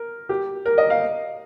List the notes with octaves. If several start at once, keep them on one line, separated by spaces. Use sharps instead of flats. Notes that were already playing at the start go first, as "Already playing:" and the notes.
Already playing: A#4
G4
A#4
D#5
F5